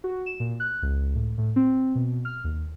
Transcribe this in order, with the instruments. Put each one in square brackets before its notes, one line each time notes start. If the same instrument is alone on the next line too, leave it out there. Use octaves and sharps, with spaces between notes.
[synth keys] F#4
E7
A#2
F#6
C#2
A2
A2
C4
B2
F6
D#2